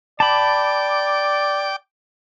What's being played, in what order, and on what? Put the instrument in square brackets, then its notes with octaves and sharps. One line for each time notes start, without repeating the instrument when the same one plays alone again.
[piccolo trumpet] D5 [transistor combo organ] G5 D6 [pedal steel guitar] A5 B5